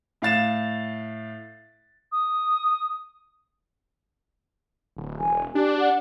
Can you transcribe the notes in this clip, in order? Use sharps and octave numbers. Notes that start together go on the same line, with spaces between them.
A2 F5 A6 E7
D#6
D1
E1 G#5
D4 G4
F#5